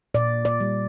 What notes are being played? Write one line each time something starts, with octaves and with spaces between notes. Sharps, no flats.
A#2 D5
D5
G3